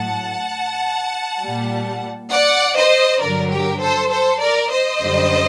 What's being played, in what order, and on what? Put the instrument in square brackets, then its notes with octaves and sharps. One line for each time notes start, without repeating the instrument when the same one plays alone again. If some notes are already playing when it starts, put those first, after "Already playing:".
Already playing: [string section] A2 F#3 F#5 A5
A#2 G3
D5 F#5
C5 D#5
G2 D3 F#3 A#4 D5
G4 A#4
A4 C5
A4 C5
A#4 D5
C5 D#5
F#2 D3 G3